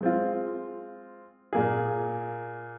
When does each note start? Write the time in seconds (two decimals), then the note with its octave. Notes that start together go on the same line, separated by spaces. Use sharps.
0.01 G#3 C4 F4
1.53 A#2 A#3 G#4